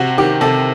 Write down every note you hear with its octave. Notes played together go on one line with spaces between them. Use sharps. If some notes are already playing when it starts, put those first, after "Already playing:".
Already playing: C3 F#4
D#3 G4
C3 A4